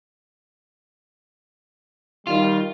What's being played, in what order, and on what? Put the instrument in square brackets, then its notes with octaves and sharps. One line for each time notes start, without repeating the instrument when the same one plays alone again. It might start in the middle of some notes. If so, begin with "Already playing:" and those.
[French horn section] D#3 G3 [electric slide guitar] F4